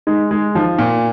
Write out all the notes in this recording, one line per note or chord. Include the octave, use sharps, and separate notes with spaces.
G#3 D#4
G#3
F3 D#4
A#2